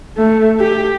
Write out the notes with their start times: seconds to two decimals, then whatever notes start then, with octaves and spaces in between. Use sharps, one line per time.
0.17 A3
0.60 G4